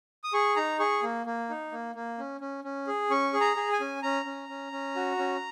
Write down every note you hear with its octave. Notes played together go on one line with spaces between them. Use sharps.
D#6
G#4 C#6
D#4 A#5
G#4 C#6
A#3
A#3
D#4
A#3
A#3
C#4
C#4
C#4
G#4
C#4 C#6
G#4
A#5
G#4
G#5
C#4
C#4 A#5
C#4
C#4
C#4
F#4
C#4